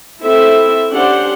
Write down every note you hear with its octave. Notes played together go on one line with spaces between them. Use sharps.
C4 E4 A4 E5
C#4 D4 G4 C5 F#5